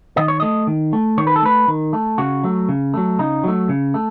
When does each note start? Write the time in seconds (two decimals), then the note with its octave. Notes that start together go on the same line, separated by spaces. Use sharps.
0.17 D#3 D#5
0.28 C#5
0.40 A3 D#5
0.67 D#3
0.93 A3
1.18 D#3 C#5
1.27 B4
1.36 A4
1.43 A3 B4
1.68 D#3
1.93 A3
2.18 C#3 F#4
2.44 F#3 A3
2.69 C#3
2.94 F#3 A3
3.19 C#3 D#4
3.44 F#3 A3
3.69 C#3
3.94 A3